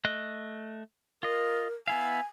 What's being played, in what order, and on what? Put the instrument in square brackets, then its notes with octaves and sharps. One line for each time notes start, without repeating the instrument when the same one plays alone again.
[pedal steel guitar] A3 D#5 F#6
[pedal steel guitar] F4 D#5 [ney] A#4
[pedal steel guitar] B3 E4 F5 [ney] G#5